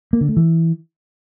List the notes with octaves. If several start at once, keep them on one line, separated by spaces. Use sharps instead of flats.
A#3
D3
A3
E3